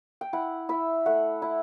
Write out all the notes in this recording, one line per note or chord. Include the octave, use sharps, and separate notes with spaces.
G5
E4 F#5
E4 E5
A3 F#5
E4